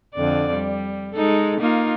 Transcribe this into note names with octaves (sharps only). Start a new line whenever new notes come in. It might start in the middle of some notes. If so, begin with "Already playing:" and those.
F2 D3 D5
G3
G#3 D#4 A4
A#3 D#4 F4